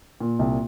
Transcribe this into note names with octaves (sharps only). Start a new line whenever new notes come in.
A#2
C2